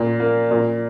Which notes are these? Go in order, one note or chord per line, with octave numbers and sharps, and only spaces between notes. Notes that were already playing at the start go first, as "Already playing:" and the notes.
Already playing: A#2
A#3
A#2